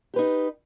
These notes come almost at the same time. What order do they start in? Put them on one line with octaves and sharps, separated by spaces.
G4 B4 D#4